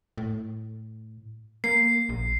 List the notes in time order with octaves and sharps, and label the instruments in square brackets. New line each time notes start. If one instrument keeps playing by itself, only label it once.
[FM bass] A2
[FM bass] A#3 [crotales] C7
[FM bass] A#1